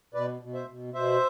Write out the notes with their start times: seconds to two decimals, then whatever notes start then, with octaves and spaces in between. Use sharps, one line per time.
0.14 B2 B4 D5
0.41 B2
0.54 C5 E5
0.68 B2
0.94 B2 C5 E5